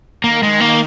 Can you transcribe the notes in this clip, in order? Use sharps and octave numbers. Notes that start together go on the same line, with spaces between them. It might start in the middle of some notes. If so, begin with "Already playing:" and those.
D#3 A#3
G#3
A#3